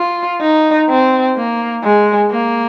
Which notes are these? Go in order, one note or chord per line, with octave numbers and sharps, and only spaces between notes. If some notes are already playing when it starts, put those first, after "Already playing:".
Already playing: F4
D#4
C4
A#3
G#3
A#3